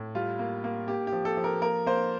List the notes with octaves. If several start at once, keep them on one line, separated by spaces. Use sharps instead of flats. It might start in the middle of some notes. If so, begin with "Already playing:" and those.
Already playing: A2
G3 F4
A#3
A#3
A#3 G4
G4
F3
A4
F3
A#4
A#3 A#4
A#3 C5